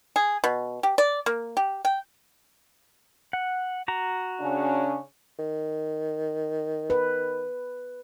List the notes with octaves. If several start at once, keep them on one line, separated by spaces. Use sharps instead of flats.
G#4
B2
G4
D5
A#3
G4
G5
F#5
F#4 A#5
C#3 C#4 D4
D#3
B4